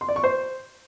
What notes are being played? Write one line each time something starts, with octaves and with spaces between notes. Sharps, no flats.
C6
D5
C#6
C5